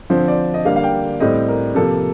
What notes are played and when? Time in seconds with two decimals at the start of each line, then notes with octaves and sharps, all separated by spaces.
0.10 D3 F3 C4 C5
0.28 D5
0.54 D#5
0.65 D3 G3 A#3 F5
0.76 F5
0.83 G5
1.20 A2 G3 C4 D#5
1.48 A#4
1.75 C3 F3 A#3 A4